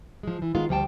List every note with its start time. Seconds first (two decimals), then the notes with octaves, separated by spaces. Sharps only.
0.23 F3 G#3
0.42 E3
0.55 D#3 G#3 B3 F4
0.69 D2 F3 G3 F#5 G5 A5